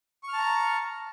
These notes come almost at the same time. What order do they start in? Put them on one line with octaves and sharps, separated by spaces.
C#6 F6 A5 A#5